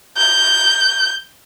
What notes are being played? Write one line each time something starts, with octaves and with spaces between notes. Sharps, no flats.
G6